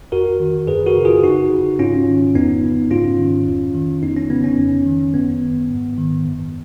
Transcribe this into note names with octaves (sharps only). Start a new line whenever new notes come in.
F2 F#4 A#4
D#3
F#2 G#4 B4
F#4 A#4
C#3
F4 G#4
F2 D#4 F#4
C#3
G#2 C#4 F4
D#3
F2 B3 D#4
C#3
G#2 C#4 F4
D#3
F2
D#3
F2 B3 D#4
C#4
C#3 B3
C#4
F2
D#3
F#2 B3
D#3
G#2
D#3
F#2